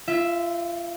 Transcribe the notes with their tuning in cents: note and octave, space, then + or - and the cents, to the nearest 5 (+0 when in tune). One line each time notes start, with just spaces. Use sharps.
F4 -30 E5 +0